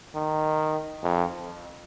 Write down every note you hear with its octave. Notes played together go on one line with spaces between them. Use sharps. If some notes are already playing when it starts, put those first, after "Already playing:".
D#3
F2